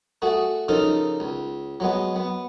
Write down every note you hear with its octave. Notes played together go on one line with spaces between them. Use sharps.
A3 F#4 G#4
C#3 F3 D#4 A4 A#4
C#2
F#3 G#3 B3
B3